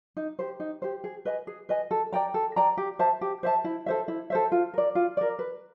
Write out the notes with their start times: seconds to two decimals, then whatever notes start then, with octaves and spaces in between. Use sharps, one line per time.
0.17 D#4
0.39 G4 C5
0.60 D#4
0.82 G4 C5
1.04 G#4
1.25 B4 D#5 G#5
1.47 G#4
1.69 B4 D#5 G#5
1.91 A4
2.13 D5 G5 A#5
2.34 A4
2.56 D5 G5 A#5
2.77 G4
2.99 C5 E5 A5
3.21 G4
3.43 C5 E5 A5
3.64 E4
3.86 A4 C5 E5
4.08 E4
4.30 A4 C5 E5
4.52 F4
4.74 A#4 D5
4.95 F4
5.17 A#4 D5
5.39 B4